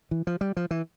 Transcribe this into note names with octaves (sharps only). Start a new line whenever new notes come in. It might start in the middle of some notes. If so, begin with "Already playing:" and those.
E3
F3
G3
F3
E3